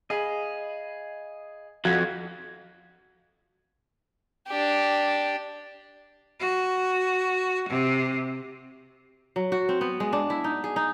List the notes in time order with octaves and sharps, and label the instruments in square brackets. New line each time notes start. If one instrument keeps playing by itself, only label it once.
[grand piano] G#4 [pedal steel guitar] D#5 F5 B5
[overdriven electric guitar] F2 [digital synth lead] F#4 [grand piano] G#6
[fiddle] D4 G4
[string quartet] F#4
C3
[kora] F#3
F#4
C4
B3
G#3
D4
E4
D#4
G#4
D#4